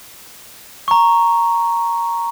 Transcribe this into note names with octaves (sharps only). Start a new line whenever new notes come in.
A#5 C#6